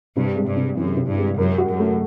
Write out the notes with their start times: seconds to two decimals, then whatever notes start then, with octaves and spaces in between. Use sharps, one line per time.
0.16 G2 C3
0.36 G#3
0.47 G2
0.57 C3
0.77 F#2 E3
0.97 C3
1.07 G2
1.18 G#3
1.38 F#2 A#4
1.58 F#4
1.69 F#2
1.79 A3